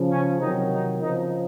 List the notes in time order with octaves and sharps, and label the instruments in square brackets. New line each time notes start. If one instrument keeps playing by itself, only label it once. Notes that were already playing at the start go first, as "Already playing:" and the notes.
Already playing: [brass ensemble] C#3 F3
C#4
C3 D#3 F#3 D#4
D#4
C#3 F3 D#4